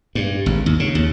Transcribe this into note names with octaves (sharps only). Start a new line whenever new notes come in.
G2
G#1
D#2
C#3
D#2